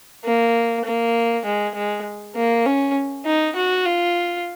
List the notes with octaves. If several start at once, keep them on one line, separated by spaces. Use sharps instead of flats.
A#3
A#3
G#3
G#3
A#3
C#4
D#4
F#4
F4